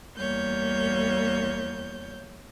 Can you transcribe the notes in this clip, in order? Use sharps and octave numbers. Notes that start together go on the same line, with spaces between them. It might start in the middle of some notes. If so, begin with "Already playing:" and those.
E2 G3 A#3 C#5 G6